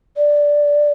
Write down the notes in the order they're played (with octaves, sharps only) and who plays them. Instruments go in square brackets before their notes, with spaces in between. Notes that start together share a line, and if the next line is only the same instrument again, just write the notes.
[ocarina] D5